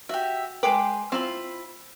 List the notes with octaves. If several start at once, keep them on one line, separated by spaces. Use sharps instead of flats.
F#4 G4 E5
G#3 B4 G5 C6 D6
C4 E4 F4 B5